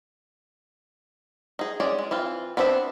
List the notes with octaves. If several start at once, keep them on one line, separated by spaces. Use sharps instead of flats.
D#4 G#4
G#3 C#4 G#4 D5
G#3
E3 C4 F4
B3 C4 D4 B4 E5